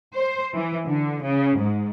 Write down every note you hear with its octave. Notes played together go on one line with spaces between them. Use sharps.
C5
E3
D3
C#3
G#2